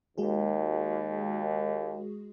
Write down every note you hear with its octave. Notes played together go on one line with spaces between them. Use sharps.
D#2 G#3 F#4 G#4